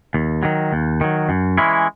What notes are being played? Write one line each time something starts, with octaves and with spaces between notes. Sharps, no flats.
D#2
D#3 F#3
D#2
D#3 F#3
F#2
E3 G#3 C#4 E4